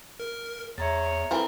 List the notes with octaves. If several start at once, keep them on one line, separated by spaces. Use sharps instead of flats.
A#4
E2 C#5 E5 A#5 A6
E3 C4 E4 A4 A#4 B5